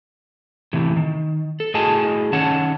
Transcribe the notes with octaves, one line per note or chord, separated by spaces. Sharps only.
A2 C3 E3
D#3
A4
A2 F#4 G#4 D#5 G#5 A5
D#3 C#4 C#5 F#5 A5